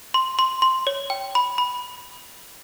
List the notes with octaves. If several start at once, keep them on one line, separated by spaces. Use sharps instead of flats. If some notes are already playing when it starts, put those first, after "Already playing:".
C6
C6
C6
C#5
G5
B5
B5